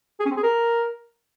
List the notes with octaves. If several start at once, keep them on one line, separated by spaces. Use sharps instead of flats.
G#4
C#4
C4
G#4
A#4